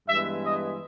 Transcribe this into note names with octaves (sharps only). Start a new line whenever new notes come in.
G2 E3 G#3 B3 E5
D#5